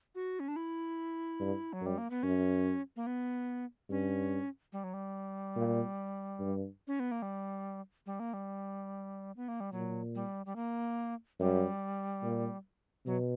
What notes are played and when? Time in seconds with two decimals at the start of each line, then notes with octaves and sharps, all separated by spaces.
0.15 F#4
0.40 C#4
0.48 D4
0.56 E4
1.40 G2
1.73 F#3
1.81 F#2 G3
1.98 A#3
2.10 B3
2.23 F#2 C#4
2.96 A#3
3.07 B3
3.90 G2 C#4
4.73 G3
4.84 F#3
4.94 G3
5.56 A#2
6.40 G2
6.87 C#4
7.00 B3
7.11 A#3
7.22 G3
8.06 G3
8.20 A#3
8.33 G3
9.37 B3
9.48 A#3
9.60 G3
9.72 A#2 F#3
10.15 G3
10.46 G3
10.56 A#3
11.40 F#2 G3
12.23 A#2
13.06 B2 F#3